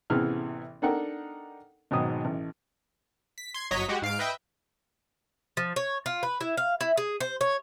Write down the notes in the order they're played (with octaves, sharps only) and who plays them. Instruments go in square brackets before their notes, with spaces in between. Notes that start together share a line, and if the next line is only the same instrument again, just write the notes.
[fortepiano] A1 C3 E3 B3 G#4 F6
D4 D#4 A4 A#4 F#5 G5
G#1 G#2 B2 F#3 D#6
A1
[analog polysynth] B6
C6 G#6
G1 F#3 C#5 D#5 A#5 B6
G#3 F#4 G4 F#5
G#2 F5 C7 D7
B4 D#5 E5 G5
[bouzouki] F3
C#5
F4
B4
E4
F5
E4
G#4
C5
C#5